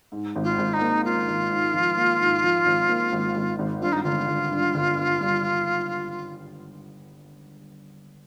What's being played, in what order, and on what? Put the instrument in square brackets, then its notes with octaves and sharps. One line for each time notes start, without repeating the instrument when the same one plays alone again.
[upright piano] G#2
G#1
[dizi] F4
[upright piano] G#1
[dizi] D#4
[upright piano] A#3
[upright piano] A#3 [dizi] F4
[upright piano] G#1
G#2
F3
A#3
G#2
F3
G#1
A#3
G#1
G#1
G#1
[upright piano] G2 [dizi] F4
[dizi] D#4
[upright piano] G1 [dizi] F4
[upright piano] G1
G2
G1
G2
G3